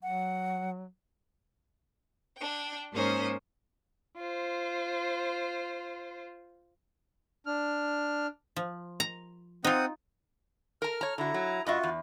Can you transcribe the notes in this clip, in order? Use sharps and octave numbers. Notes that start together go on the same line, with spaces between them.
F#3 F#5
D4 G5
G#2 A#3 C#4 A#4 C5 D#6
F4 C5
D4 F6
F3
A#5
C4 D#4 F4 F#5 D#6
A#4 A#5 F6
C#5 A#5
D3 E4 F#4 A#5
F#3
G2 F4 F#4 D#5 E5
E2